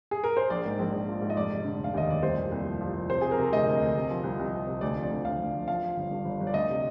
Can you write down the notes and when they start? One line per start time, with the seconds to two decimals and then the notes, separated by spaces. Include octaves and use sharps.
0.11 G#4
0.24 A#4
0.37 C5
0.50 A#1 D5
0.65 G#2
0.79 A#1
0.93 A#1
1.08 F3
1.22 G#2
1.30 D#5
1.37 F1 D5
1.51 F1
1.65 D3
1.79 F1
1.84 F5
1.94 D#2 D#5
2.08 F1 D5
2.22 C2 C5
2.37 A#2
2.52 C2
2.66 F3
2.81 F3
2.94 F3
3.10 C3 C5
3.21 C3 G#4
3.31 A#4
3.38 C3
3.53 D2 D#5
3.67 D2
3.81 D2
3.96 C3
4.10 F3
4.24 C2
4.39 C2
4.53 C2
4.67 C3
4.81 D2 D5
4.96 F3
5.03 D5
5.11 D2
5.25 D2 F5
5.39 D2
5.54 F3
5.68 F3 F5
5.82 F3
5.97 G1
6.11 G2
6.25 G1
6.40 G1
6.47 D5
6.54 D2 D#5
6.69 C3